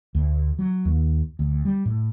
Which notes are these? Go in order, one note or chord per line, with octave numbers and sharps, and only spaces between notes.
D2
F#3
D#2
D2
G3
A2